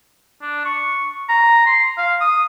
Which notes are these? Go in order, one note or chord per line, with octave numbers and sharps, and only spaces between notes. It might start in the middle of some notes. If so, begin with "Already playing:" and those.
D4
C#6
A#5
C6
F5
D#6